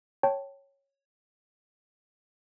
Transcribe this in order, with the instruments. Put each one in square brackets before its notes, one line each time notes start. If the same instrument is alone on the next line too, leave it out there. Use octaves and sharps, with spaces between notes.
[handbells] C#5 G5 A5